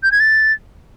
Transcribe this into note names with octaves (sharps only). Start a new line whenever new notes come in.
G6
G#6
A6